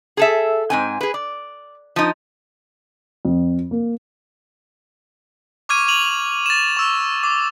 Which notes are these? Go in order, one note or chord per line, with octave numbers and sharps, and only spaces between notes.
G#4 A4 E5
G#2 C4 G#5
G#4 B4
D5
F3 D#4
F2
A#3
C#6 D6 F6 G#6 D#7
D#7 F7 F#7
A6 E7
C#6 E6
D6